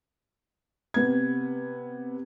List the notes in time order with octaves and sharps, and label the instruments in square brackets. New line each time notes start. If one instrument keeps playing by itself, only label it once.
[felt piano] C3 B3 G#6